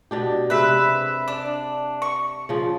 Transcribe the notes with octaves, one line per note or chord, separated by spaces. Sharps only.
B2 D4 G4
C3 G#3 B4 E5
D4
C#6
C#3 F3